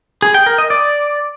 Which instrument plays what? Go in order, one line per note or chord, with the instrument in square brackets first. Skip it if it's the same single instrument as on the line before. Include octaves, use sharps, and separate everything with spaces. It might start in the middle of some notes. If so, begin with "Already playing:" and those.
[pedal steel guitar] G#4
G5
A#4
D#5
D5